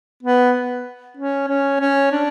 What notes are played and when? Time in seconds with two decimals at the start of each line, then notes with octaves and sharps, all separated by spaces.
0.23 B3
1.17 C#4
1.48 C#4
1.80 C#4
2.12 D4